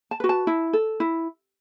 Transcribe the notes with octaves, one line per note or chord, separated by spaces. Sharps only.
A5
F#4 B4
A5
E4
A4
E4